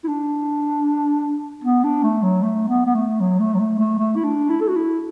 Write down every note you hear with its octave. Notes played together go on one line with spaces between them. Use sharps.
E4
D4
B3
D4
A3
F#3
A3
B3
B3
A3
F#3
A3
F#3
A3
A3
A3
E4
D4
E4
A4
F#4
E4